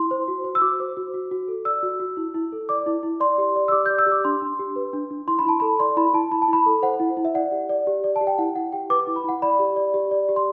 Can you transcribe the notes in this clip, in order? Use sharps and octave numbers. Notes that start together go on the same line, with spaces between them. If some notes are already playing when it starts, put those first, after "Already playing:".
Already playing: E4 C6
C5
F#4
C5
E6
F#4 D6
C5
F#4
F#4
F#4
A4
D5 E6
F#4
F#4
E4
E4
A4
D5 D6
E4
E4
D5 C6
G4
D5
E6
G4 D6
D5 G6
E6
G4
D6
D4 C6
D4
G4
B4
D4
D4
E4 C6
B5
E4 A5
A4 B5
D5 C6
E4 B5
E4 A5
E4 B5
A5
E4 B5
A4
C5 F#5
E4
E4
E5
D5 F#5
G4
D5
G4
D5
A5
G4
G5
E4 F#5
E4 F#5
G4 G5
B4 D6
E4
B5
E4 F#5
D5 B5
G4
D5
G4
D5
G4
C6